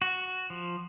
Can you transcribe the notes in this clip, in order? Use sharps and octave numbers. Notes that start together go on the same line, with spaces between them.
F#4
F3